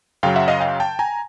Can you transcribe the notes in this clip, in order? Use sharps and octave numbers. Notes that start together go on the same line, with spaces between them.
F#2 C#3 F#3 F5 G5
E5 F#5
D#5 F5
F5 G5
G5 A5
G#5 A#5